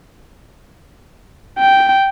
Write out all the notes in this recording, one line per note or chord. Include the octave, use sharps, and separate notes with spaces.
G5